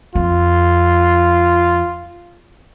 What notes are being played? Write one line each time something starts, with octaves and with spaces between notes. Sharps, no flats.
F2 F4